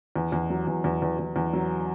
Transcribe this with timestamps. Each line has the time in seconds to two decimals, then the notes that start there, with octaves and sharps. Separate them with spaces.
0.16 E2
0.32 E2
0.50 F#3
0.67 E2
0.84 E2
1.02 E2
1.19 E2
1.36 E2
1.53 F#3